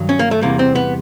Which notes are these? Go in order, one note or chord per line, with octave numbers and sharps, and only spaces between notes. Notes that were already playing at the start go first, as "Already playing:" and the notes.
Already playing: G2 D#3 F#3
C#4
A#3
A3
E2 C3 E3 G3 A#3
C4
B3